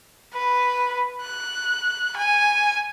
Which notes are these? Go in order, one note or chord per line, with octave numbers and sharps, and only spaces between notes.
B4
F#6
G#5